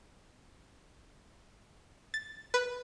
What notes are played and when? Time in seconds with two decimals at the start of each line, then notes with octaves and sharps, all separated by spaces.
2.14 A6
2.54 B4